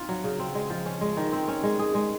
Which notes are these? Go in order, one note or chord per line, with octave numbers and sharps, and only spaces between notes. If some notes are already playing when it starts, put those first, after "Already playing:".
Already playing: C4 D#4 F4
F#3
C#3
C4
G#3
F3
C#4
G#3
D#3
C4
C#4
G#3
G#4
G#3